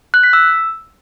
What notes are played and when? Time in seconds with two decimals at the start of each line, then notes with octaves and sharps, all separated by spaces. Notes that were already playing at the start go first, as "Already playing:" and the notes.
0.14 F#6
0.23 B6
0.33 E6